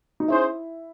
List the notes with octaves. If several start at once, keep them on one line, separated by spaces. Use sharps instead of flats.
D#4
C#4 E4 G#4 C5